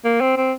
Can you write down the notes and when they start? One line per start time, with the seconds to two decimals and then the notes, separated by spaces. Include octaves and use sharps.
0.05 A#3
0.21 C4
0.37 C4